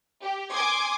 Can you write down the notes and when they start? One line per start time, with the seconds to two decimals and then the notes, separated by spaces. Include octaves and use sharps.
0.21 G4
0.52 G#5 C6 D6 D#6 G#6